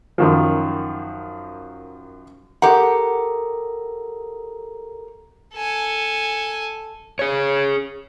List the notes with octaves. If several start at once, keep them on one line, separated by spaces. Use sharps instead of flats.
F#2 D#3 F3
G4 A4 A#4 F#5 A#5
A4 G#5
G#4 C#5